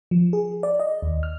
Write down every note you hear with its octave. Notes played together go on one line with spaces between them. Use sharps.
F3
G#4
D5
D#5
D#2
F6